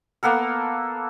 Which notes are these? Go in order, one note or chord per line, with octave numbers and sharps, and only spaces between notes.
A#3 B3 A4 A#4